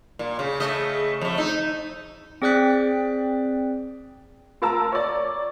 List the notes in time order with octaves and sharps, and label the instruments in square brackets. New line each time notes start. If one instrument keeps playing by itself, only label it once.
[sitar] A#2
C#3
C#3 A3 D#5
F2 A3
D#4
[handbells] C4 G#4 D5 G5 F#6 B6
[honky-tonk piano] F4 A#4 A5 A#5 E6
C#5 D5